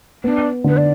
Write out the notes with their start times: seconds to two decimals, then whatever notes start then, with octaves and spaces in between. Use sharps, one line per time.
0.24 B3 D4
0.64 D3 B4
0.77 D5